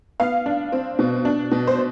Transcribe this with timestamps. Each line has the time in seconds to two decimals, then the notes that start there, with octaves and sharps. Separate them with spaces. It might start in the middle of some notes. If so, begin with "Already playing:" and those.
0.20 B3 F5
0.46 D4
0.72 C4
0.99 B2
1.25 D4
1.51 B2
1.67 C5